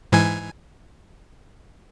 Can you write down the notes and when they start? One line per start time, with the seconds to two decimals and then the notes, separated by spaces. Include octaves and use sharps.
0.12 G#2 E3 G#5